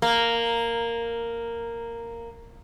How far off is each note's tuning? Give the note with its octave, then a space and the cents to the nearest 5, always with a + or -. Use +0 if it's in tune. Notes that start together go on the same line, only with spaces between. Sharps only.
A#3 -5